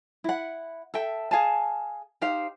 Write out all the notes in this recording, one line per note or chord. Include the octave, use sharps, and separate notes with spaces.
E4 F#5
A4 E5 G5
G#4 F5 G#5 A5
D#4 G4 C5 F5